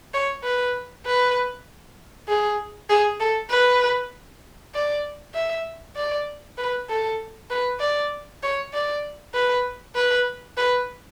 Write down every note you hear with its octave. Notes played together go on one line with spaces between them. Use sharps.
C#5
B4
B4
G#4
G#4
A4
B4
D5
E5
D5
B4
A4
B4
D5
C#5
D5
B4
B4
B4